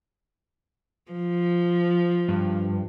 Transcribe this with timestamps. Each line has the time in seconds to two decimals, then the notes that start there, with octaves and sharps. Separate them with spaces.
1.11 F3
2.29 G2